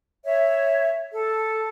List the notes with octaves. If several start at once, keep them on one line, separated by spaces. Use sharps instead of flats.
C#5 E5
A4